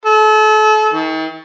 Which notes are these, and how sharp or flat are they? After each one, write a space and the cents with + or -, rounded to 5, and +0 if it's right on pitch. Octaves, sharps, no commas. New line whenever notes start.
A4 -35
D#3 +40